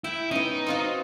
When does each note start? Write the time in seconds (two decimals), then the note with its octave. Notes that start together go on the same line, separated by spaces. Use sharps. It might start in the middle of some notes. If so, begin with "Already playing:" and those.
0.04 E4 G5
0.31 B3 C#4 D#4
0.66 C4 F4 F#4